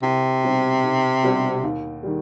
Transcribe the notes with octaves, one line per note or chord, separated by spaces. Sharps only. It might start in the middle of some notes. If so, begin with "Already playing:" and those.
C2 C3
B2 G3 C4 D#4
B1
B2 G3 C4
D#2
D#3 G3